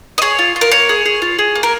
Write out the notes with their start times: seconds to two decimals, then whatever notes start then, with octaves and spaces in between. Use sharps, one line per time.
0.18 D#5
0.22 G#4 C#5
0.39 F4
0.56 F4
0.61 A#4
0.71 A#3 C#5
0.89 G#4
1.06 G#4
1.22 F4
1.39 G#4
1.55 A#3
1.63 A#4